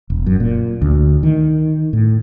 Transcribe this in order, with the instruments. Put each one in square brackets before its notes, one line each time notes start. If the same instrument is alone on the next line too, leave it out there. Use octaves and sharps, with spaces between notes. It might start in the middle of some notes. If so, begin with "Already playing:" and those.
[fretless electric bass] E1
F#2
A#2
D2
D#3
A2